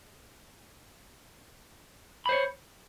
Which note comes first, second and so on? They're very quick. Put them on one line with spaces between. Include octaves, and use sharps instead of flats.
B5 C5 C#5